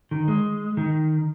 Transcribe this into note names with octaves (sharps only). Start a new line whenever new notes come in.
D#3
G#3
D#3